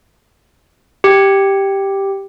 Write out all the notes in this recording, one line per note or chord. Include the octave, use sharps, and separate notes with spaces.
G4